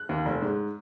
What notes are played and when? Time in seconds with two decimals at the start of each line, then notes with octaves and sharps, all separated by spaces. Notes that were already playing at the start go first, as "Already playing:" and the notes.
Already playing: F#6
0.09 D#2
0.25 F1
0.42 G#2